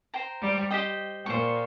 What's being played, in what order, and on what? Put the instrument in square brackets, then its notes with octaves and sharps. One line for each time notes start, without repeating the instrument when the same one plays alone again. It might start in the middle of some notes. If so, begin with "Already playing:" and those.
[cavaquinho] C5 G5 A#5
[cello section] G3
[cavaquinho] G4 C5 D#5 G5
[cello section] A#2 [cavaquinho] C5 G5 C#6